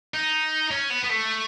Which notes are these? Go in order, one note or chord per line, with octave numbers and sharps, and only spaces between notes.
D#4
C#4
B3
B3
A3